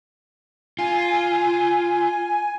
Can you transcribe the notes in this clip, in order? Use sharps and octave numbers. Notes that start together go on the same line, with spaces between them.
F4 G#5